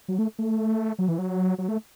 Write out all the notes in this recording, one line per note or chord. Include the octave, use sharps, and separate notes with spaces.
F#3
A3
A3
F#3
E3
F#3
F#3
A3